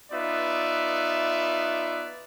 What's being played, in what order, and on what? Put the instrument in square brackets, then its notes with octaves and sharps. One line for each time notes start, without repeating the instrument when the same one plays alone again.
[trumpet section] B3 D#4 F4 B4 D5 E5